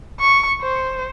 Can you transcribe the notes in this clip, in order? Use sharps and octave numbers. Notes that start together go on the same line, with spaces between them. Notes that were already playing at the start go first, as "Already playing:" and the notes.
C#6
C5